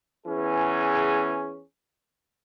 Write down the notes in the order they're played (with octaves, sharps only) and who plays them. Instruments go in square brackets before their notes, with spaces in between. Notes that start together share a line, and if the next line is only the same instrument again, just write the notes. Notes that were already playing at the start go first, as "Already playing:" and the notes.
[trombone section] E2 E3 C#4 G#4